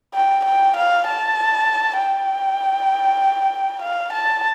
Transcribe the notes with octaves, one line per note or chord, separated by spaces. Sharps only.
G5
G5
F5
A5
G5
F5
A5